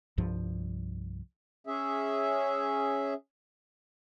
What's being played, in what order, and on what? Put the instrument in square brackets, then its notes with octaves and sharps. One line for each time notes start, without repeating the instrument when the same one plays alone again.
[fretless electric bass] C2 G2 F3
[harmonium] C#4 G#4 E5